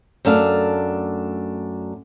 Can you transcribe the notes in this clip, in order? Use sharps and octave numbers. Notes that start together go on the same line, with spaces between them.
F#2 A3 D4 F5